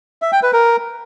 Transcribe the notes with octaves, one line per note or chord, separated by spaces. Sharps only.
E5
G5
B4
A#4